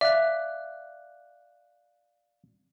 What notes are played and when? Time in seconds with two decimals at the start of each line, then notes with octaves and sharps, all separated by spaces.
0.01 D5 E5 F5 F#6